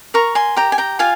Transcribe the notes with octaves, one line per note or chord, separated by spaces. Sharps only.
A#4 A#5 C#6
G#5 C6
G4 G5 A#5
G#5
G5 A#5
F4 F5 G#5